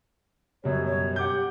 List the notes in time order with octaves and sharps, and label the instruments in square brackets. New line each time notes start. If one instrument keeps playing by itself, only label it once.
[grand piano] F#2 B2 G3 [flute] C#5
[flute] C#5
[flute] G4 [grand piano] F#5 D6 G6